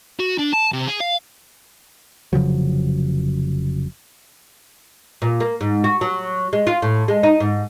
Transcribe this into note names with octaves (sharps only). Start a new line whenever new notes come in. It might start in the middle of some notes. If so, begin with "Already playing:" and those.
F#4
D4
A5
C3
G#4
F5
F1 C#3 F3 F#3
A#2
A#3
G#2
F#4
F#3
G#3
F4
A2
G#3
D#4
G#2